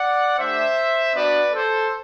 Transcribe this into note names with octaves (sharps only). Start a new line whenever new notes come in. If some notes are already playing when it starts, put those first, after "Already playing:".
Already playing: D5 F#5
A3 D4 G4 C5 E5
B3 D4 F#4 B4 D5
A4 C5